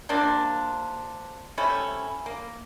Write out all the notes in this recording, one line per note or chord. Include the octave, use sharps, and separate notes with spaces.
C3 A#3 D4 F4
C3 A3 C#4 E4
A#3